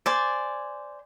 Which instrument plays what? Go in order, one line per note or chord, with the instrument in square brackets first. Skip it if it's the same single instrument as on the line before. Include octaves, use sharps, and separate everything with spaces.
[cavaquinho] C5 D5 G#5